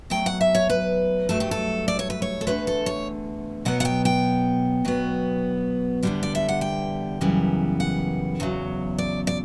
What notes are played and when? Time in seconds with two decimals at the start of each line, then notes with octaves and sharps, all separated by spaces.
0.10 B2 F#3 A3 G5
0.26 F#5
0.41 E5
0.55 C#5
0.70 B4
1.29 G2 F#3 A3 A4
1.40 G4
1.51 A4
1.88 D5
1.99 C#5
2.10 B4
2.22 C#5
2.41 A4
2.47 E2 D3 A3 B4
2.67 A4
2.86 C#5
3.65 B2 F#3 B3 F#5
3.80 F#5
3.85 G5
4.05 G5
4.85 B2 F#3 B3
6.03 E2 D3 G3 B3
6.23 D5
6.35 E5
6.49 F#5
6.61 G5
7.21 F#2 C#3 E3 G3 B3
7.80 F#5
8.40 E2 C#3 F#3
8.98 D5
9.27 D5